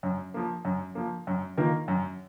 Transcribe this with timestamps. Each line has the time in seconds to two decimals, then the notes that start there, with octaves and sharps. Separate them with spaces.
0.03 F#2
0.34 F3 A#3
0.65 F#2
0.95 F3 A#3
1.27 F#2
1.57 D#3 A#3 F4 A#4
1.88 F#2